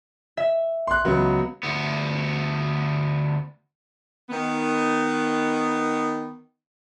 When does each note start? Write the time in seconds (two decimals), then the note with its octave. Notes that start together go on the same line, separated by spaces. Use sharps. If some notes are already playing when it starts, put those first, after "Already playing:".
0.37 E5
0.87 C6 F#6
1.04 C#2 F#3 B3
1.63 D2 B3
4.30 D#3 B3